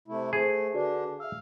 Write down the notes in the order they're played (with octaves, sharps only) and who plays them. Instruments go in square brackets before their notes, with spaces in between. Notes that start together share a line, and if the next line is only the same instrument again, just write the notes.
[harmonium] C3 A3 E4
[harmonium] A3 [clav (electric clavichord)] G#4 [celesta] A4 C5
[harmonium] D3 D4 [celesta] F#4 B4 D5
[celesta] E5 E6 [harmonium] F5